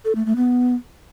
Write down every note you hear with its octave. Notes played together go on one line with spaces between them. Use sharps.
A4
A3
A3
B3